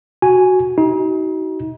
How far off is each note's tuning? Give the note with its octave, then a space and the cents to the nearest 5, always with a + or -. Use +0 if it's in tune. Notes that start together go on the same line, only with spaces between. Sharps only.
F#4 +0 G#5 +0
D#4 +35 F#4 +30